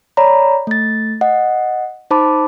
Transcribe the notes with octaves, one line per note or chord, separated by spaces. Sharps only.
C#5 D5 A#5 B5
A3 A6
D#5 F#5
D#4 C5 A5 B5 D6